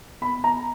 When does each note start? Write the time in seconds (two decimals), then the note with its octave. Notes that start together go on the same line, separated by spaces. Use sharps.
0.22 B3 B5
0.44 A#5